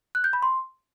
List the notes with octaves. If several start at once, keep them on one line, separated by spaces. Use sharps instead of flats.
F#6
G6
B5
C6